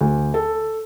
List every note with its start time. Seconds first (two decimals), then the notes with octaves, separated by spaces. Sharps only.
0.01 D2
0.34 A4